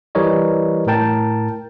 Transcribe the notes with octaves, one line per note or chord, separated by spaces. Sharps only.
E3 G3 A#4 C#5 D#5
A2 A#4 G5 A5